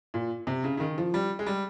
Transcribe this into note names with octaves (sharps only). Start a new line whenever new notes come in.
A#2
C3
C#3
C#3
D#3
F3
G3
G#3
G3